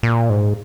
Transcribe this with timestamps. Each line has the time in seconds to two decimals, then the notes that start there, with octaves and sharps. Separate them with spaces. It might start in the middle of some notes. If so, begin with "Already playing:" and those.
0.03 A#2
0.30 G#2